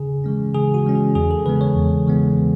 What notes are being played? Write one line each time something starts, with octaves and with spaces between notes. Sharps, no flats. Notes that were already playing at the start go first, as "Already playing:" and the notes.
Already playing: C#3 G#4
E3 G#3 C#4
C#3 G#4
F#4
E3 G#3 C#4
G#4
E2 G#4
A4
C#3 E3 G#3 B3 B4
C#5
E2
C#3 E3 G#3 B3